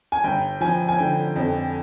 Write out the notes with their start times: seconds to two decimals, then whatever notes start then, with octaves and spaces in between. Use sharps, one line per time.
0.12 G#5
0.24 G1 G5
0.61 F3 G#5
0.89 G#5
0.99 D3 G5
1.36 F2